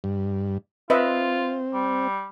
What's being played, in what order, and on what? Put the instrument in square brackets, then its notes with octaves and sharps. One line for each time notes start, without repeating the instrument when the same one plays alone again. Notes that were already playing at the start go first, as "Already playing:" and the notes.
[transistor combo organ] G2
[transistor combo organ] C4 [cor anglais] F4 [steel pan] B4 D#5 E5
[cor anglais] G3